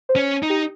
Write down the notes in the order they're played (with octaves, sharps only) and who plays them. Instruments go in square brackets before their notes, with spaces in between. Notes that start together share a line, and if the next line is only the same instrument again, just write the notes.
[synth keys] C5
[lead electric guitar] C#4
D#4
[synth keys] G4